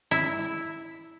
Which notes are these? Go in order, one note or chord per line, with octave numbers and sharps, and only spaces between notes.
E4